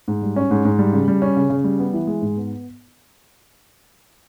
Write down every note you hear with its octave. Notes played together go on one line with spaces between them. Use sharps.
G#2
G3
C#4
G#2
G#2
G3
C#3
G3
C#4
C#3
C#3
G3
B3
E3
G#3
G#2
B3